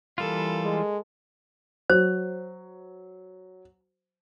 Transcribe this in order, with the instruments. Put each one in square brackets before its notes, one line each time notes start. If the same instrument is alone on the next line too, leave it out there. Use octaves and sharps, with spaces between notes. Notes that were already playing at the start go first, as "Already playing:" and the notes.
[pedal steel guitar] E3 G3 F4 [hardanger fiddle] A#3 A4
[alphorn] G#3
[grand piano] F#3 [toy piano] C5